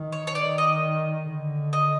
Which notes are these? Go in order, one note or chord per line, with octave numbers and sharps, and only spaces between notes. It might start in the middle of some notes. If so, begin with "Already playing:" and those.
Already playing: D#3
C#5
C#5
D#3 D5
D#5
D3
D#5